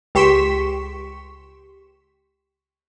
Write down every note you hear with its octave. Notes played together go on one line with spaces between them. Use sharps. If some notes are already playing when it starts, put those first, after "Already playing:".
C#2 G4 C6 C#6 B6 E7